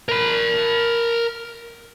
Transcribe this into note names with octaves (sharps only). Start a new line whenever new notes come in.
A#4 B5